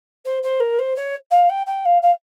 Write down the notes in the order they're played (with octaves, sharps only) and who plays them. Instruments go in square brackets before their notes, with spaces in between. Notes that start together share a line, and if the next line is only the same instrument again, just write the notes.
[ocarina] C5
C5
A#4
C5
C#5
F5
G5
G5
F5
F5